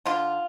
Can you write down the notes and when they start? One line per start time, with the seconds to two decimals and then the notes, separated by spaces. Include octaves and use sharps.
0.05 D3 F4